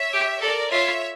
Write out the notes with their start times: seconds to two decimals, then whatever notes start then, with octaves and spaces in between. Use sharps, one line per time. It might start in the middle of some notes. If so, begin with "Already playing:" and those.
Already playing: C#5 E5
0.13 G4
0.41 A4 A#4 D5
0.71 F4 C#5 E5